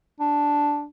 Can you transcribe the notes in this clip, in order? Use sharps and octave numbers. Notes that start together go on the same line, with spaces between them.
D4